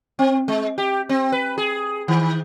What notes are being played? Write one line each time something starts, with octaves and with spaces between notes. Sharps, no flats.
C4
G#3
G4
C4
B4
G#4
D#3